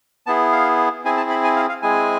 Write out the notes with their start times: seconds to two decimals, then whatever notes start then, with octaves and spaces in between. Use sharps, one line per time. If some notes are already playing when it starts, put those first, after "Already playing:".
0.27 B3 E4 G#4 A5
0.52 F5
1.04 C4 E4 G#4 G#5
1.17 A5
1.30 B5
1.44 G#5
1.56 F5
1.69 F5
1.82 G#3 C4 E4 G#4 G#5